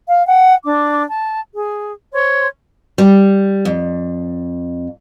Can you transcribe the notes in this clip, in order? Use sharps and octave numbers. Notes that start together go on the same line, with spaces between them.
F5
F#5 G5
D4 D6
A5
G#4
C5 C#5 C6
G3
F2